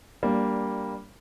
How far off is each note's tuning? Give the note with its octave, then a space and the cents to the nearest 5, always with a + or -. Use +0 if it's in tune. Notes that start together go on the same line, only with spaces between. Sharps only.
G3 +0 A#3 +0 D4 -15